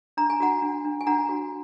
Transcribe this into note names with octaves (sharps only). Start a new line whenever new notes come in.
D4 A#5
G#5
F#4 F#5 A#5
D4
D4
G#5
D4 F#5 A#5
F#4